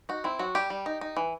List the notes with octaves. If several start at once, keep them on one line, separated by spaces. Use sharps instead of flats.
D#4 F#4
C4 E4
F#3 F#4
G3 G4
G3
D#4
D#4
E3